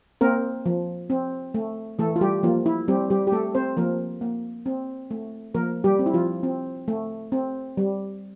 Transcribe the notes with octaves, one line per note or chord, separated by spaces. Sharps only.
A#3 C4 A#4
F3
C4
A3
E3 A3 A4
F4
G3 G4
F3 A#3 F4
E4
G3 C4 G4
G3 G4
G4
A3 A4
C4 C5
F3 A#3 A#4
A#3
C4
A3
F3 A#3 A#4
G3 G4
C4
E4
F3 F4
C4
A3
C4
G3